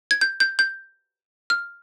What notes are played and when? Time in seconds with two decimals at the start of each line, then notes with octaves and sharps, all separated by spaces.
0.11 G#6
0.21 G6
0.40 G6
0.59 G6
1.50 F6